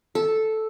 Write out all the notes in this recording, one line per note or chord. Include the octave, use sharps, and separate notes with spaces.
A4